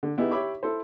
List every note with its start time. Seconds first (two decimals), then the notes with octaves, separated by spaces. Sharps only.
0.03 D3
0.18 B3 D#4 E4 G4 G#4
0.31 G4 C#5 E5 B5 D6
0.63 E4 A4 C5